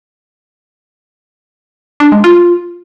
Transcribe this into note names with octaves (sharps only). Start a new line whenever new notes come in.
D4
G#3
F4